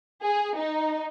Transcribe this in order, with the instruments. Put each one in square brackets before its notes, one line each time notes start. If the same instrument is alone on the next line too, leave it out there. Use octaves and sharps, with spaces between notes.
[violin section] G#4
D#4